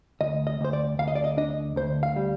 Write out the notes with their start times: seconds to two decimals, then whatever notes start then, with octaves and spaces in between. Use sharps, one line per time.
0.21 D2 D#5
0.47 D#5
0.61 D2 C5
0.73 D5
0.99 D2 F5
1.08 D#5
1.15 D5
1.24 D#5
1.37 D4 D#5
1.76 D2 C5
2.03 F5
2.16 G3